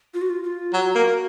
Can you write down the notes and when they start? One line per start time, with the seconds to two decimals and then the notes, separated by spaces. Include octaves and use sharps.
0.14 F4
0.22 F#4
0.29 F4
0.44 F4
0.73 F#3 F#4
0.95 A#3